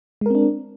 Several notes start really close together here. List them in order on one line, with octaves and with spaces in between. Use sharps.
G#3 A#4 C4 D4